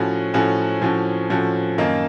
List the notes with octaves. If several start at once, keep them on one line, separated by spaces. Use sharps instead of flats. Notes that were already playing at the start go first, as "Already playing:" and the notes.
Already playing: A2 F3 A3 C#4 F#4
A2 F3 A3 C#4 F#4
A2 F3 A3 C#4 F#4
A2 F3 A3 C#4 F#4
F#2 D#3 A#3 D#4